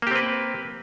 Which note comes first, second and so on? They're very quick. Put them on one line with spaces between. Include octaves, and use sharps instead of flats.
A#3 G4 C4 B4